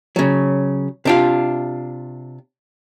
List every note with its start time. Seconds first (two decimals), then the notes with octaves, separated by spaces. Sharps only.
0.16 C#3 F#3
1.05 C3 D4 F4